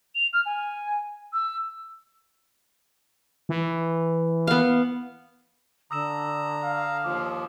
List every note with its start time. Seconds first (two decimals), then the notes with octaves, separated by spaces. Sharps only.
0.15 F7
0.33 F6
0.46 G#5
1.33 E6
3.49 E3
4.47 B3 F5
5.91 D3 A#5 D#6 E6 E7
6.63 F5
7.04 D#2 F3 D6